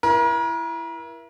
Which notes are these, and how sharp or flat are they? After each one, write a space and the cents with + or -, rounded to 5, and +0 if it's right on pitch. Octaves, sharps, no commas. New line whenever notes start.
E4 +20 A#4 +40